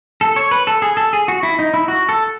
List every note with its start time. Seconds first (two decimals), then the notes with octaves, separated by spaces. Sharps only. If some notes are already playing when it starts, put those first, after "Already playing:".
0.21 A4
0.36 C#5
0.51 B4
0.67 A4
0.82 G#4
0.97 A4
1.13 G#4
1.28 F#4
1.43 E4
1.59 D#4
1.74 E4
1.88 F#4
2.09 A4